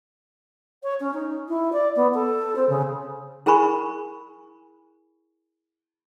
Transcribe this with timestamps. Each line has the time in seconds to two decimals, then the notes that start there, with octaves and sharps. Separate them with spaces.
0.83 C#5
1.00 C#4
1.13 D#4
1.48 E4
1.72 D5
1.95 B3
2.14 A4
2.55 C4
2.69 C#3
3.46 E4 G#4 A#4 G#5 B5 C#6